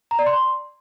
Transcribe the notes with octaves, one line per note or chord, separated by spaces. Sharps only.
A#5
D5
C6